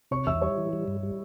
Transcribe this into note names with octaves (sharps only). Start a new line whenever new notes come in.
C3 C#5 C#6
E2 E5 E6
G3 C#5 C#6
E3
G3
G2
G3